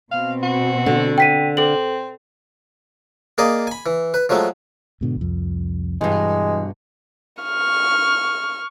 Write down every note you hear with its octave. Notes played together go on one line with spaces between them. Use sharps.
B2 C4 F5
F#4
D3
G5 B6 D#7
C4 A4 F#7
A#3 G#4 D5 D#5
G#5 B5
E3
B4
F3 F#3 G#3 A3
G#2 B2 D3
C2 F2
G2 B2 E3 G#3
C#6 F6